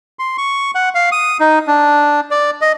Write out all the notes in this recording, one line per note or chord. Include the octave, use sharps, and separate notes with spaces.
C6
C#6
F#5
F5
D#6
D#4
D4
D5
D#5